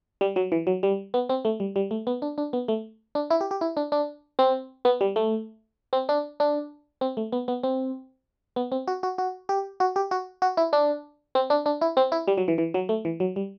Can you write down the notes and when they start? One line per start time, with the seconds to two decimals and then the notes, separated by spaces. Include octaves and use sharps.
0.21 G3
0.36 F#3
0.52 E3
0.67 F#3
0.83 G3
1.14 B3
1.29 C4
1.45 A3
1.60 G3
1.76 G3
1.91 A3
2.07 B3
2.22 D4
2.38 D4
2.53 B3
2.68 A3
3.15 D4
3.30 E4
3.41 G4
3.51 G4
3.61 E4
3.77 D4
3.92 D4
4.39 C4
4.85 B3
5.01 G3
5.16 A3
5.93 C4
6.09 D4
6.40 D4
7.01 C4
7.17 A3
7.32 B3
7.48 B3
7.63 C4
8.56 B3
8.72 C4
8.88 F#4
9.03 F#4
9.18 F#4
9.49 G4
9.80 F#4
9.96 G4
10.11 F#4
10.42 F#4
10.57 E4
10.73 D4
11.35 C4
11.50 D4
11.66 D4
11.81 E4
11.97 C4
12.12 E4
12.28 G3
12.38 F#3
12.48 E3
12.58 E3
12.74 F#3
12.89 A3
13.05 E3
13.20 F#3
13.36 G3